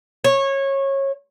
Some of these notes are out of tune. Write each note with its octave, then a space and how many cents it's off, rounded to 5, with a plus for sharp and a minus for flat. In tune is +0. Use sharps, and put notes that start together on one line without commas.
C#5 -20